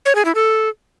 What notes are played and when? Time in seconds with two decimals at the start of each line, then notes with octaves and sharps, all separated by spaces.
0.06 C#5
0.15 G#4
0.25 E4
0.35 A4